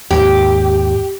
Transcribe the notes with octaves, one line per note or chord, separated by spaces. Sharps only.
D#2 G#2 G4